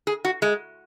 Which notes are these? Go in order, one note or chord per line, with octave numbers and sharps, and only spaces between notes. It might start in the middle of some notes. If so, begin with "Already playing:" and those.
G#4
F#4
G#3